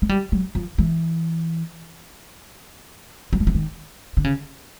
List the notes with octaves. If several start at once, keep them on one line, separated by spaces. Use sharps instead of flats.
G#3
G3
F#3
F3
E3
F#3
F3
E3
D#3
D3
C#3